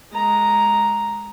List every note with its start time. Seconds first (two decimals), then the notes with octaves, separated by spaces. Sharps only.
0.12 G#3 A#5